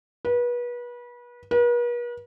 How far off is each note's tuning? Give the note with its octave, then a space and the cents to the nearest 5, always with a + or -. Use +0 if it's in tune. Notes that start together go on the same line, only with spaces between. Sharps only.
B4 -30
B4 -45